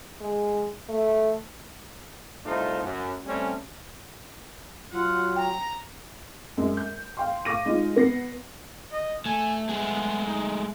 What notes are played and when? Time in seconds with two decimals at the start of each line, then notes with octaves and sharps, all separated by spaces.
0.21 G#3
0.89 A3
2.45 C2 A3 D#4 F4 C5
2.83 F#2
3.26 G3 A3 C4 C#4
4.92 F#3 F4 F#5
5.36 G5 A#5
6.57 F#2 G#3
6.77 G6
7.17 F5 G5 C6
7.45 F5 C#6 D6 A#6 D#7
7.65 G#3 D#4 F4
7.96 B3 A#6 C7
8.92 D#5
9.26 A3 G#5
9.69 G#3 A3 B3 G#4
10.27 D#4